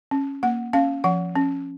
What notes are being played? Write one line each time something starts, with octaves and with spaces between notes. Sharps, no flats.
C#4
A#3 F#5
C#4 F5
F3 F#5
C#4